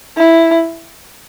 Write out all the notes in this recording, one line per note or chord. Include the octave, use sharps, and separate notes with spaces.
E4